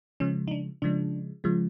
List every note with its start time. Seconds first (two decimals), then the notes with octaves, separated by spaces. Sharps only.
0.20 C#3 F3 G#3 C#4
0.48 D#4
0.51 D4
0.82 C#3 F3 G#3 D4
1.44 C#3 F3 G#3